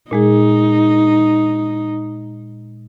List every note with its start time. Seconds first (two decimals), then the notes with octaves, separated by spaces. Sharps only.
0.11 A#2 G#3 D#4 G#4